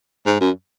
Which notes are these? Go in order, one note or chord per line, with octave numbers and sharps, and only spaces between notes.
G#2
F#2